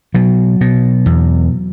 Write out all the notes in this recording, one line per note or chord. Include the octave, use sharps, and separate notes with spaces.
B2 F#3
B2
E2